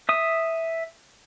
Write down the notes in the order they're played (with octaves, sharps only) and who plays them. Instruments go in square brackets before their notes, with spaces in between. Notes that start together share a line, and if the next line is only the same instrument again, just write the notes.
[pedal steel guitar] E5 D#6